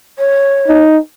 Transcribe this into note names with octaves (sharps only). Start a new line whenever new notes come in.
C#5
D#4